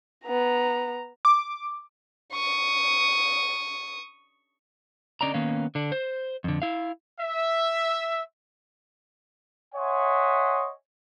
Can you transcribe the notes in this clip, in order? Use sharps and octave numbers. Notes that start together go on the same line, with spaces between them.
B3 A#5
D6
C#6 D#6
D3 C#4 D5 D#5 A#5
D#3 A#3 B3 C#4 F5
D3 D4
C5
F2 D3
E4 F5
E5
C#5 D#5 E5 F#5 G#5 C6